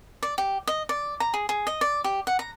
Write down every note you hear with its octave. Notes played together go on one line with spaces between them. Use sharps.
D5
G4
D#5
D5
A#5
G#4
G#4
D#5
D5
G4
F#5
A#5